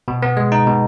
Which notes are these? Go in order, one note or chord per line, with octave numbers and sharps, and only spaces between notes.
B2
B3
G#3
D#4
B2